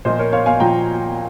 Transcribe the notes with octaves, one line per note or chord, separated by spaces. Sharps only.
A#2 F3 C5 D#5
A#4 C#5
C#5 F5
F5 G#5
A#2 F3 G5 A#5